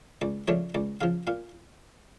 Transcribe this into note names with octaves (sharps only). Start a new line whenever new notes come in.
C#2 D5
C#3 F3 A3 D4 C#5
C#2 D5
C#3 F3 F5
A#2 F5